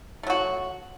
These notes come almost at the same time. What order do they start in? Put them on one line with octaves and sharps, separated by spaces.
A3 F#3 F#4